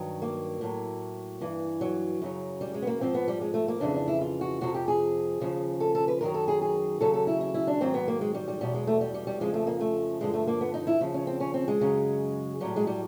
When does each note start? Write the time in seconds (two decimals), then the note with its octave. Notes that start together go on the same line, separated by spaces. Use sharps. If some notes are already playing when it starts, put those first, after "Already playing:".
Already playing: G2 D#3 F#3
0.22 A#3
0.61 A2 F#3
1.41 G2 E3
1.81 F#3
2.22 F#2 C#3 F#3
2.61 G3
2.74 G#3
2.82 B3
2.87 A#3
3.01 G#2 F3 C4
3.14 B3
3.28 G3
3.41 G#3
3.54 A3
3.68 A#3
3.80 F2 C#3 E3 D4
3.95 D4
4.08 E4
4.21 F4
4.41 F#4
4.61 F2 C3 F3 F#4
4.75 G4
4.88 G#4
5.41 D#2 C#3 F3
5.80 A4
5.95 A4
6.08 B4
6.21 F#2 D#3 F#3 A#4
6.34 A4
6.48 G#4
6.61 G#4
7.01 D#2 C#3 F#3 A4
7.14 A4
7.27 E4
7.41 E4
7.54 E4
7.67 D4
7.81 G#2 D#3 F#3 C4
7.94 B3
8.08 A#3
8.21 G#3
8.34 G3
8.48 G3
8.61 E2 B2 F#3 G3
8.74 G#3
8.87 A3
9.01 G3
9.14 G3
9.27 G3
9.40 F2 C#3 F3 G#3
9.54 A3
9.67 A#3
9.80 A3
10.21 G2 D3 F3 G#3
10.34 A3
10.47 A#3
10.61 B3
10.74 D#4
10.87 E4
11.01 D#2 C#3 F3
11.14 C#4
11.27 C4
11.40 C#4
11.54 C4
11.68 G#3
11.81 F#2 C#3 F#3
12.60 A2 F#3 G3
12.76 G#3
12.87 G3